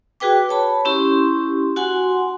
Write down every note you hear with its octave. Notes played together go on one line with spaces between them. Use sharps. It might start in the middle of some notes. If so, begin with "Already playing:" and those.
F#4 G#4 B4 G5 D6
C#5 A5 B5
C#4 E4 G4 C6
F#4 F#5 G#5 C6